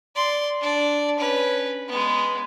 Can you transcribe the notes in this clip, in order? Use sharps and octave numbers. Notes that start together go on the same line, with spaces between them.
D5 C6
D4 D5
C#4 B4
G#3 B3